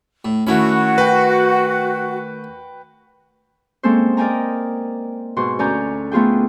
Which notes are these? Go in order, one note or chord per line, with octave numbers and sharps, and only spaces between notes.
A2
D#3 A3 C#4 E4 F#4 B5
B4 G5
G#3 A#3 C4 C#4 A4 C5
A#4 D5 D#5 G5 G#5 A#5
G#2 B2 F#4 C6
D2 C#4 D5 G#5 A#5 G6
A3 B3 F4 G#4 G5